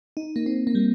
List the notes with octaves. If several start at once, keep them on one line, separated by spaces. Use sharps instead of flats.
D#4
A#3
C4
A#3
G3